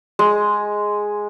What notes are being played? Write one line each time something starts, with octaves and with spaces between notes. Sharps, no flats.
G#3